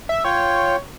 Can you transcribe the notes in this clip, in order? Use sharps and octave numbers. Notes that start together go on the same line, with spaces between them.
E5
F4 C#5 G5